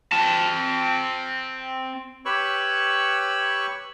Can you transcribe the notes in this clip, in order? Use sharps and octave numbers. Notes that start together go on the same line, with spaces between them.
C4 A5
G4 B4 C#5 B5 C#6 E6